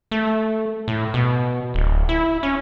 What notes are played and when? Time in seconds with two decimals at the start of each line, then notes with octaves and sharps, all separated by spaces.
0.11 A3
0.88 A2
1.14 B2
1.74 D1
2.09 E4
2.43 C#4